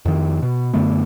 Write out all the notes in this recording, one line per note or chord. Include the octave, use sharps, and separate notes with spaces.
F2 D#3
B2
F#2 D3 A3 B3